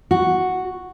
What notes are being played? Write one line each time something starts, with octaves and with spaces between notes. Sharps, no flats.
F#4